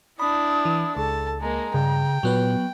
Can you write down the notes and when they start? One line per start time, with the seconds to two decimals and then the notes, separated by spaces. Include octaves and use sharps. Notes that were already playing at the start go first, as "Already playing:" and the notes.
0.20 D4 E4 B5 D#6
0.65 E3
0.97 C#2 A4 A5
1.41 G#3 A#3 A#5
1.74 G2 C#3 G5
2.23 A#2 F#3 B3 B4